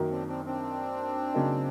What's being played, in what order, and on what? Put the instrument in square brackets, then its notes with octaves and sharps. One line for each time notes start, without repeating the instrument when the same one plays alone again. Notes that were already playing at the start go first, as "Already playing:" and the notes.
Already playing: [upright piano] F#2 D#3 F#3 A#3
[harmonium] C4 D4
C4 D4
C4 D4
[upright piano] C#3 F#3 A#3 D#4